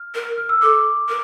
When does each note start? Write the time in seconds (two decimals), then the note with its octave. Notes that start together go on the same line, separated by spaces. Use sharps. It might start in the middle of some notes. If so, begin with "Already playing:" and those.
Already playing: F6
0.15 A#4
0.38 F6
0.49 E6
0.61 A4 D6
1.09 A#4